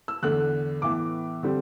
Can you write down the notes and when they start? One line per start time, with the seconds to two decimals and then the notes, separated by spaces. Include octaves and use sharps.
0.08 E6
0.23 E2 D3 A3 F#6
0.82 A2 E3 B3 D6
1.43 D3 G3 C4